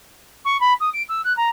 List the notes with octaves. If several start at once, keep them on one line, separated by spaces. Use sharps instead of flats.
C#6
B5
D#6
D7
E6
F#6
A#5